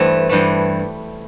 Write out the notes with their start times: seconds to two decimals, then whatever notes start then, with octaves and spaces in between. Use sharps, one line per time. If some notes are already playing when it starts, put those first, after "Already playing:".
Already playing: G2 E3 A3 C4
0.29 G2 E3 A3